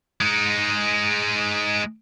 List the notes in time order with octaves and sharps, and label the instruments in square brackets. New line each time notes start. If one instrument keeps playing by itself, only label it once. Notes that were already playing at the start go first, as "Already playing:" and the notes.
[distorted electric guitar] G#3 D#4